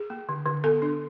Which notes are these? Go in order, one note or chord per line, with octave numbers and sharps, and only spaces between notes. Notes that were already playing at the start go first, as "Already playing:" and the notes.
Already playing: G#4
A#3
D3
D3
B3 A4
D4